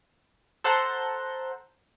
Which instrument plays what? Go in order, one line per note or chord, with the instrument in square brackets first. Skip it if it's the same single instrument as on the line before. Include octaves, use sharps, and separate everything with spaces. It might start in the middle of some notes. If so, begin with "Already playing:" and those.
[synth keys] A4 C5 F#5 A5 A#5 G6